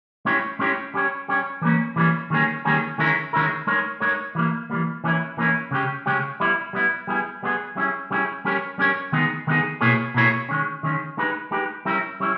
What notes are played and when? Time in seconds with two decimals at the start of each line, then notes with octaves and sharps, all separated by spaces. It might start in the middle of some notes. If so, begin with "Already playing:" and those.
0.25 G#3 C#4 E4 G4 C#5
0.59 G#3 C#4 E4 G4 C#5
0.94 G3 C#4 G4 C#5
1.28 G3 C#4 G4 C#5
1.61 E3 G3 A#3 C#4
1.96 E3 G3 A#3 C#4
2.30 D#3 G3 A#3 C#4 G#4
2.65 D#3 G3 A#3 C#4 G#4
2.98 D#3 G#3 C#4 E4 A#4
3.33 D#3 G#3 C#4 E4 A#4
3.67 G#3 D#4 A#4 C#5
4.00 G#3 D#4 A#4 C#5
4.35 E3 G3 A#3
4.70 E3 G3 A#3
5.04 E3 A#3 C#4 E4
5.37 E3 A#3 C#4 E4
5.71 C#3 G#3 C#4 G4
6.06 C#3 G#3 C#4 G4
6.40 G3 B3 E4
6.73 G3 B3 E4
7.07 G3 B3 E4 G#4
7.43 G3 B3 E4 G#4
7.76 G3 C#4 E4 G#4
8.11 G3 C#4 E4 G#4
8.45 G3 C#4 G4 A#4 C#5
8.78 G3 C#4 G4 A#4 C#5
9.12 D#3 G#3 B3 D#4 G#4
9.47 D#3 G#3 B3 D#4 G#4
9.81 B2 A#3 E4 G#4 C#5
10.14 B2 A#3 E4 G#4 C#5
10.49 D#3 G#3 C#4
10.83 D#3 G#3 C#4
11.17 G#3 D#4 G4 B4
11.51 G#3 D#4 G4 B4
11.85 G3 C#4 E4 A#4
12.20 G3 C#4 E4